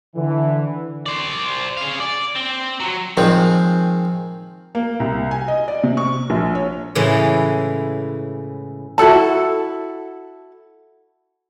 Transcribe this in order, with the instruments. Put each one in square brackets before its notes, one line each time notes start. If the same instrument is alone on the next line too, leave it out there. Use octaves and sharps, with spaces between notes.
[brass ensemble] D3 E3
[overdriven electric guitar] C5 D5
G#4 F5
D5
C4
F#3
[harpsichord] D#3 F3 G#3 C4
[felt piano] A#3
C2
G#5
D#5
D5
C3
C#6
A#1
C#5
[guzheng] A2 C#3 E3 G#3
[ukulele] E4 F#4 A4 A5